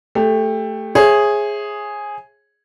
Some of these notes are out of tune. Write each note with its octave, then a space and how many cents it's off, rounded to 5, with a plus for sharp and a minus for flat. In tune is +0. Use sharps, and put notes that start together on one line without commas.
A3 +0 G4 +20
G#4 +0 C#5 -40 E5 +0